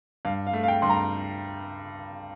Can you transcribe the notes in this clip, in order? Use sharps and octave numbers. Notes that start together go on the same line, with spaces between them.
G2 F5
F5
A3
F5
G5
G2 C6
A#5